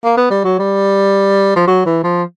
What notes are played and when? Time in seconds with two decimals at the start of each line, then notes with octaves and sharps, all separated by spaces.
0.04 A#3
0.17 B3
0.30 G3
0.44 F#3
0.59 G3
1.56 F3
1.67 F#3
1.86 E3
2.04 F3